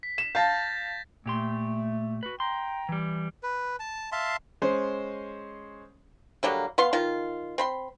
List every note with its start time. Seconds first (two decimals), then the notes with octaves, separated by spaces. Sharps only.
0.03 B6
0.18 E7
0.35 F5 A5 G6 A6 A#6
1.26 A#2 A3 G4 C6
2.23 F#4 B4
2.40 G5 A#5 C6
2.89 E3 G3
3.43 B4
3.80 A5
4.12 E5 F5 A5 C6
4.62 G#3 C#4 C5
6.43 D3 F#3 G3 A#3
6.78 B3 F5 C6
6.93 D#3 F4
7.58 C4 B5 C6